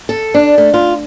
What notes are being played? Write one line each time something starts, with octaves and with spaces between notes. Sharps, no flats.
A4
D4
A3
F4